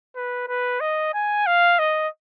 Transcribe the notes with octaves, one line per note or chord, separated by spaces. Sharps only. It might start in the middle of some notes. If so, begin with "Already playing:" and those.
B4
B4
D#5
G#5
F5
D#5